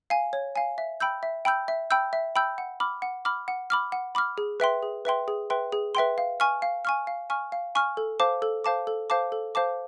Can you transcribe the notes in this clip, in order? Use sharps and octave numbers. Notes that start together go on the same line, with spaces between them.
F5 G#5
C#5
F5 G#5
E5
G5 B5 E6 G6
E5
G5 B5 E6 G6
E5
G5 B5 E6 G6
E5
G5 B5 E6 G6
F#5
B5 D6 F6
F#5
B5 D6 F6
F#5
B5 D6 F6
F#5
B5 D6 F6
G#4
B4 E5 G5 C6
G#4
B4 E5 G5 C6
G#4
B4 E5 G5 C6
G#4
B4 E5 G5 C6
F5
G#5 C#6 F6
F5
G#5 C#6 F6
F5
G#5 C#6 F6
F5
G#5 C#6 F6
A4
C5 F5 A5 D6
A4
C5 F5 A5 D6
A4
C5 F5 A5 D6
A4
C5 F5 A5 D6